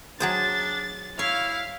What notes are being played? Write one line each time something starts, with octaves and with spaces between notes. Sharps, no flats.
F#3 D4 G#4 C5 A6
E4 C#5 F5